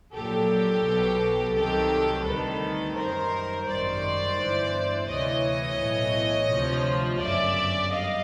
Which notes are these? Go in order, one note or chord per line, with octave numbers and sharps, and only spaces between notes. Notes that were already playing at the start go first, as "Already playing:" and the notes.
A#1 A#2 F#3 G4 A4
B1 B2 F#3
C2 C3 D#3 F#3 G4 A4
D2 C3 D#3 G3 A4 B4
F#2 D#3 G3 A#4 C5
G#1 F#2 D#3 G3 C5 D5
G1 G2 E3
D2 C3 E3 C#5 D#5
B1 A2 E3
D2 C3 F3
G1 F#2 C#3 D5 E5
G3 D#5 F5